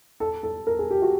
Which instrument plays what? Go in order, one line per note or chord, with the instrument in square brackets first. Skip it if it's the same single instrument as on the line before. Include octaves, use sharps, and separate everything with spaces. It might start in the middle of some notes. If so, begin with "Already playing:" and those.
[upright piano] A4
A4
A#4
G#4
G4
F#4